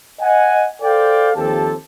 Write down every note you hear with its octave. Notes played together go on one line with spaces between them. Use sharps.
D#5 F#5 G#5
A4 C5 D5 F5 G5
D#2 F3 C4 G4 A4 A5